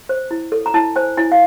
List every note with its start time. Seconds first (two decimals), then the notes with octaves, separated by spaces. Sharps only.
0.09 C5
0.31 E4
0.52 A4
0.66 A#5
0.74 E4 A5
0.96 C5 G#5
1.17 E4 G#5
1.32 F5